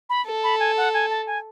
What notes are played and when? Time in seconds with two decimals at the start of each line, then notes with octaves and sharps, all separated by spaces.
0.10 B5
0.26 A4
0.43 B5
0.60 G#5
0.77 F#5
0.94 G#5
1.10 A5
1.27 G#5